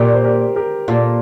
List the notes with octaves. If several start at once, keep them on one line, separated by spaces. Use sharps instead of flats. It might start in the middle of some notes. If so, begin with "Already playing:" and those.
Already playing: A#2 G4 A#4
C5
G4 A#4
G4 A#4
A#2 F4 A4